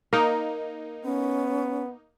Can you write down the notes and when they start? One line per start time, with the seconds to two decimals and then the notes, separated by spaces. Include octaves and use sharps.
0.13 A#3 D#4 A#4
1.05 B3 C#4